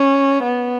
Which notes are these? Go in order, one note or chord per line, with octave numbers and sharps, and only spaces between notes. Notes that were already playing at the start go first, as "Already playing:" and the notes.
Already playing: C#4
B3